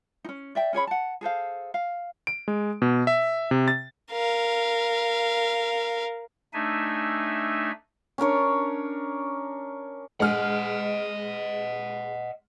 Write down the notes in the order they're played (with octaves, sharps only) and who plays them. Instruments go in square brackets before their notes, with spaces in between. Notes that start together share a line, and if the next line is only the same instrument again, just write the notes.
[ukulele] C#4 D#4
D5 E5 G5
C#4 G#4 C#5 B5
F#5 A5
G#4 A4 C5 F5
F5
[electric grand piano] D7
G#3
B2
E5
C3
A6
[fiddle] A#4 F5
[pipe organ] A3 D4 D#4 E5 G#5
[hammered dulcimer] C#4 D4 A#4 C#5
[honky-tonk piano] G#3 F6 [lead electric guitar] D#5 F#5